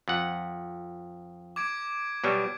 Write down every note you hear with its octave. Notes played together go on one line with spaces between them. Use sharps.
F2 F#5
D6 G#6 D7
B2 F#3 G3